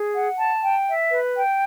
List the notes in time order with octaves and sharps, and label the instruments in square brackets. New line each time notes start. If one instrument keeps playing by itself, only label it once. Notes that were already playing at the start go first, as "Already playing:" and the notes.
Already playing: [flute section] G#4
F#5
A5
G5
E5
B4
G5